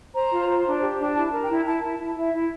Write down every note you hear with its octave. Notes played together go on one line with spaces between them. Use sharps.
C5 A#5
F4
C5
D4
G4
D4
E4 A5
A#4
G5
E4
E4 A5
E4
A5
E4
E4 E5
E4